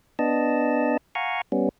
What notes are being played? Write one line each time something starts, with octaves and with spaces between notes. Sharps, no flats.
B3 D4 D#5 A5
F5 F#5 G#5 A#5 C#6
G3 B3 C#4